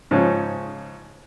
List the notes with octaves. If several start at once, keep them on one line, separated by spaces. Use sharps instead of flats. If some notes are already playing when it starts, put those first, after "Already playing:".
G#2 C#3 F3 C#4